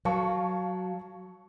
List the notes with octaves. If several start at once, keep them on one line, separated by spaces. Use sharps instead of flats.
F#3 F5 A5 C#6